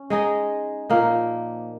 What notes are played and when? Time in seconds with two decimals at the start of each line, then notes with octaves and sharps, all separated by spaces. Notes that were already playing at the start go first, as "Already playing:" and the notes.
Already playing: C#4
0.10 G#3 D#4 G#4 D#5
0.89 A#2 F3 A#3 D#4